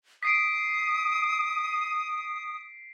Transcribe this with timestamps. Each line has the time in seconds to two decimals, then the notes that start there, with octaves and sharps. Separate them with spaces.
0.23 D#6 B6 C7 D7